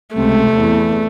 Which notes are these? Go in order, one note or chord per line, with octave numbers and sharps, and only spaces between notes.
C#2 C3 A3
E2